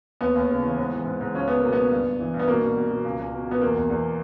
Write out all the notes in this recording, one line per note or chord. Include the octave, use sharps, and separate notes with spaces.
D#2 B3
D#2
C#3
E3
G#2
E3
G#2
G#2
C#2 C#4
C#2 B3
B2 A#3
B3
C#2
G2
G2
E3
G2
B3
B2 A#3
B2
B2
B2
C#2
C#2
B2
B2 B3
E2 A#3
E2
E2